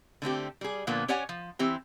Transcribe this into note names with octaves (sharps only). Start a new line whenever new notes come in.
D3 A3 C4 G4
G3 G#4
A#2 D3 F3 A#3 B3
C#4 G4 C#5 D5 F#5 G#5
F3
E3 C4 E4 G4